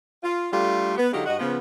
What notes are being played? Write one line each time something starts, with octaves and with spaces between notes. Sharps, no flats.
F4
G3 A3 D4 F4 G4 A4
B3
D3 F#3 G#3 D#4 F4 G4
G2 F#4 D#5
C#3 F3 B3